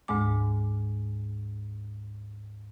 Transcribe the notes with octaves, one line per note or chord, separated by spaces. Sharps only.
D2 G#2 G#3 D6